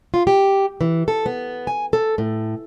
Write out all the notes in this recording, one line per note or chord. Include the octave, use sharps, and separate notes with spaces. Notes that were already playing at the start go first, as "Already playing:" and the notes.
F4
G4
E3
A4
B3
G#5
A4
A2